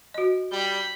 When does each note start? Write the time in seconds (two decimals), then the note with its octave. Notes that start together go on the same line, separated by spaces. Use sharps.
0.14 F#4 D#5
0.52 G3 B5 G6